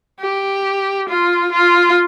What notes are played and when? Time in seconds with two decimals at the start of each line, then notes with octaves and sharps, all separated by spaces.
0.20 G4
1.09 F4
1.52 F4